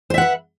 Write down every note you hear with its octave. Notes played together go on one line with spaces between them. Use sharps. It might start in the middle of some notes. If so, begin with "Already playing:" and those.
B4 C5 E5 F#5